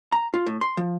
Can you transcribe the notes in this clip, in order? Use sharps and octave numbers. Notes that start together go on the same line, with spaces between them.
A#5
F4
A2
C6
F3